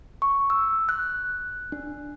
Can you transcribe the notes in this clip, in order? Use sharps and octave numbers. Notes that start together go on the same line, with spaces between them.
C#6
E6
F#6
D4